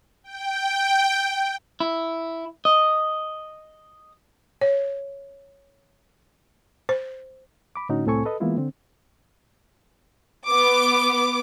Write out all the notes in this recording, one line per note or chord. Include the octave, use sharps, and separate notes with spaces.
G5
E4
D#5
C#5
C5
B5 D6
A2 D3 C#4 D#4 F#4
C2 A2 C4 A4 G#5 C#6
A4 B4 D#5
E3 G#3 A#3 B3 E4 F4
D3 C4
B3 D6